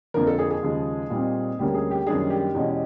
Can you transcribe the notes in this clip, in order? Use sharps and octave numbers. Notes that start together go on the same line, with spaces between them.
F2 D3 F3 A#3 D4 A#4
A4
G#4
G#4
D#2 C#3 F3 G#3
A#2 G3 C4 D#4
D2 D3 G3 A#3 C#4 G4
G#4
G4
F#2 D#3 G3 A#3 D4 G#4
G4
E2 B2 G#3 C#4